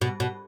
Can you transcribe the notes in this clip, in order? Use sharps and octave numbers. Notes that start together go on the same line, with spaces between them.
B2
B2